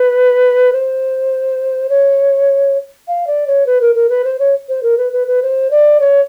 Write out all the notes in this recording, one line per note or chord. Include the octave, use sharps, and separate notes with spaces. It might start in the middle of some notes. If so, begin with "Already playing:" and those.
Already playing: B4
C5
C#5
F5
D5
C#5
B4
A#4
A#4
B4
C5
C#5
C5
A#4
B4
B4
B4
C5
D5
C#5